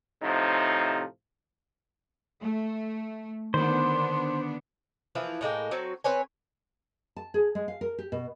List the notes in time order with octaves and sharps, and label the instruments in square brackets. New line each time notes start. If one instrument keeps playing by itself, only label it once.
[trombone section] A2 C3 F3 D#4
[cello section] A3
[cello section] D3 B3 D4 [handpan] D#3 [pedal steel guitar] C5
[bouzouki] E3 F3 A#3 E4
A2 G#3 A#3 G5
F#3 C4 F#4
C4 B4 C#5 G#5
[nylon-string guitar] A5
G#4
G#3
F5
A#4
G4
B2